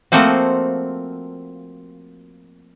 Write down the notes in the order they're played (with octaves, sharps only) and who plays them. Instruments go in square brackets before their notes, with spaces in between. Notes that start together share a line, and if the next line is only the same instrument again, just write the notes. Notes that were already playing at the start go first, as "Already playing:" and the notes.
[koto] F3 A3 A#3 C4 F#4